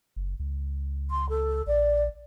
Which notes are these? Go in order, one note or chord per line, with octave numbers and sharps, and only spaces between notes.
F#1
C#2
C6
A4
A#1 D5